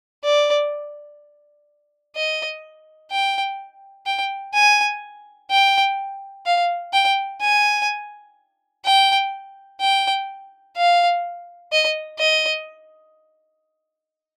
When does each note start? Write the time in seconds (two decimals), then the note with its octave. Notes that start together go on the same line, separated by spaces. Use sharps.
0.24 D5
2.16 D#5
3.11 G5
4.06 G5
4.54 G#5
5.51 G5
6.46 F5
6.93 G5
7.41 G#5
8.85 G5
9.81 G5
10.77 F5
11.72 D#5
12.19 D#5